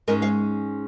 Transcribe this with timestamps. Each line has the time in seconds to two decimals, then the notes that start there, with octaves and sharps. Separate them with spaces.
0.07 G#2 G#3 C#4 A#4 D#5
0.22 C#5 F5